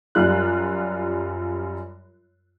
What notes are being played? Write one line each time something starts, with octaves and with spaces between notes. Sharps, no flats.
F#2 G3 F4 F#6